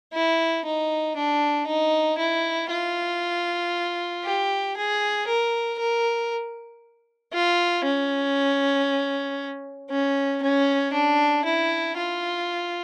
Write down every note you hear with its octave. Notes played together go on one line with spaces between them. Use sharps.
E4
D#4
D4
D#4
E4
F4
G4
G#4
A#4
A#4
F4
C#4
C#4
C#4
D4
E4
F4